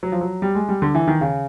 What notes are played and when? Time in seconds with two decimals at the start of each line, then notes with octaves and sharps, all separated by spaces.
0.03 F#3
0.12 F3
0.21 F#3
0.42 G3
0.55 G#3
0.69 G3
0.82 D3
0.95 E3
1.07 D#3
1.21 C#3